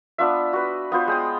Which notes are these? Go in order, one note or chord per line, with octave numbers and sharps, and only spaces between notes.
B3 D4 F4 E5
F#4 B4
B3 F4 C5
G#3 G5 D#6